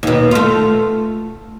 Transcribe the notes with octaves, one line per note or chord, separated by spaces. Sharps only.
D#2 B2
A3 F4